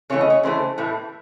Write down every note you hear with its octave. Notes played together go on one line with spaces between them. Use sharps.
C#3 E3 A3 C#5
D#5
C#5
C#3 E3 A3 C5
A2 E3 A3